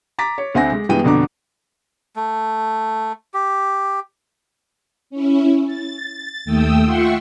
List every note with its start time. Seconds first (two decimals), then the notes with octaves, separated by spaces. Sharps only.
0.19 A#5 D6 A6 B6
0.38 C#5
0.55 D2 C4 F#5 G#5 A#6
0.72 G#3
0.89 G2 E3 G#3 B3 G5 D#7
1.03 F2 B2 D3 D4 A#5 D6
2.16 A3
3.34 G4
5.10 C#4 E4
5.66 A6
6.45 D#2 A3 G5 D#6 E6
6.84 F4 E5 F#5 G5 C6 C#6